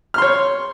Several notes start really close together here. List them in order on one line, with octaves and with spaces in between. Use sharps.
F6 C6 C#5